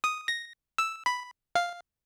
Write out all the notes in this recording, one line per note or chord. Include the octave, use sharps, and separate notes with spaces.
D#6
A#6
E6
B5
F5